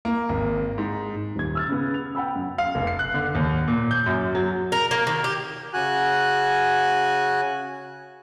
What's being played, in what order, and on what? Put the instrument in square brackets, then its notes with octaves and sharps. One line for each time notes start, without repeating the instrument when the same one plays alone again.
[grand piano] A#3
G#1
G#2
[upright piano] D#1 G#6
E6 F6 A6
C#3 B3
F7
F#5 G5 B5 E6
F#2
[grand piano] F5
F1
C7
F#6
D3
D#2
A#2
G6
F#2
F#3
[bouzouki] A#4
A#3
D#3
G4
[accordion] C#3 F#4 G#5 F#6